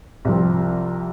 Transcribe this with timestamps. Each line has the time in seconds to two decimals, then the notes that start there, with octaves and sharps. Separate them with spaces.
0.25 C2 C3 F3 C4